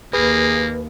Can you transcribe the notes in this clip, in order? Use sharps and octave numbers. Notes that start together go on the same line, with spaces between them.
D#2 A#3 G#4 B4